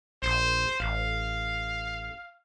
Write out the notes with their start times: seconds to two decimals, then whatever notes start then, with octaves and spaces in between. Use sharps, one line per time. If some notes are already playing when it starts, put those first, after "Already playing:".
0.23 A#1 C5
0.80 A1 F5